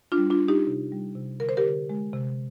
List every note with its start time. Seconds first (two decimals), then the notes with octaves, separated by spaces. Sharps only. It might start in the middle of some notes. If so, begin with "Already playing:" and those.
0.12 D4 F4
0.18 G3
0.30 D4 F4
0.43 G3
0.48 D#4 G4
0.67 C3
0.92 G3
1.16 C3
1.40 D3 A#4
1.49 C5
1.57 G4 A#4
1.66 D3
1.90 G#3
2.13 C3